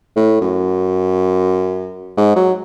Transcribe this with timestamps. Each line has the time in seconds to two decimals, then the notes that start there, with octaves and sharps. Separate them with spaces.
0.16 A2
0.41 F#2
2.17 G#2
2.36 F#3